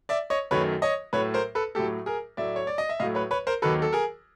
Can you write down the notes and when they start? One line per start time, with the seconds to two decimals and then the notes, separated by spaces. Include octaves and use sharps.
0.09 D5 E5
0.30 C#5 D#5
0.51 F#2 D#3 F#3 A3 B4 C#5
0.82 C#5 D#5
1.13 A2 F#3 A3 B4 C#5
1.34 A#4 C5
1.55 A4 B4
1.75 A2 F#3 A3 G4 A4
2.06 G#4 A#4
2.37 A2 F#3 A3 D5 E5
2.56 C#5
2.67 D5
2.78 D#5
2.89 E5
3.00 A2 F#3 A3 D#5 F5
3.15 B4 C#5
3.31 B4 C#5
3.47 A#4 C5
3.62 D#2 D#3 F#3 A4 B4
3.82 A4
3.93 G#4 A#4